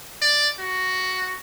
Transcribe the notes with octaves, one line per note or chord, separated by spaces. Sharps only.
D5
F#4